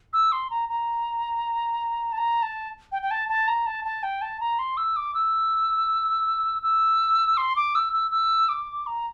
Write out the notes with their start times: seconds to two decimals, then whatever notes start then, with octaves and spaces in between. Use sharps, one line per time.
0.13 E6
0.32 C6
0.50 A#5
0.69 A#5
2.12 A5
2.18 A#5
2.42 A5
2.92 G5
3.02 G5
3.11 A5
3.29 A5
3.48 A#5
3.66 A5
3.85 A5
4.03 G5
4.21 A5
4.40 A#5
4.59 C6
4.77 E6
4.96 D6
5.14 E6
6.62 E6
7.37 C6
7.56 D6
7.75 E6
7.93 E6
8.11 E6
8.49 D6
8.86 A#5